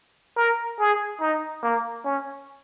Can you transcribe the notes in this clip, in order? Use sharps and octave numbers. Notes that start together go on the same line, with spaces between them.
A#4
G#4
D#4
A#3
C#4